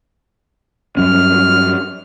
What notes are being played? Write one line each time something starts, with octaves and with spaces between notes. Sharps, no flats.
G2 F#3 C#4 F6